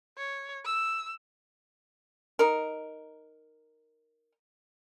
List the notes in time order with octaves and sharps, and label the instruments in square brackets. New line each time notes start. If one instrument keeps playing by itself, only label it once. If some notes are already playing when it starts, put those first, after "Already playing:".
[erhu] C#5
E6
[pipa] D#4 A#4